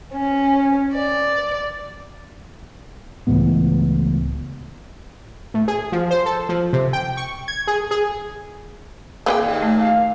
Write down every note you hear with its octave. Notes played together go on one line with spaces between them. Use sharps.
C#4
D5
C#2 A2 E3 B3
A2
G#4
F3
C5
A4
F3
C3
G5
C#6
G#6
G#4
G#4
A#3 G#4 B4 G5
D#2 A#2
A3
F5